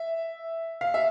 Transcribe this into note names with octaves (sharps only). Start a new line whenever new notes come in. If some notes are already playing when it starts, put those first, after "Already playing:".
Already playing: E5
F5
E5